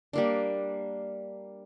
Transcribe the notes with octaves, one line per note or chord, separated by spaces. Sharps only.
G3 A#3 D4